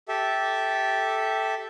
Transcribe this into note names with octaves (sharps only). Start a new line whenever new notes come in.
G4 A4 E5